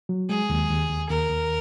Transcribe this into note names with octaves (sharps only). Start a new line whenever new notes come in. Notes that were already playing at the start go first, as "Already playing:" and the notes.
F#3
G#3 G#4
D#2
D#2
D#2
D#2 A#4
D#2